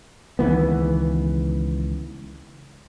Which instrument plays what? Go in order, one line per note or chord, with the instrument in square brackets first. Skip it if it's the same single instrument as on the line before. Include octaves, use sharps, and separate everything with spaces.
[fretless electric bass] C#2 D#3 E3 B3